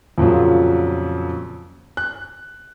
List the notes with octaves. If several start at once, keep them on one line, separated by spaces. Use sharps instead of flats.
F2 A#2 C#3 F#3
F#6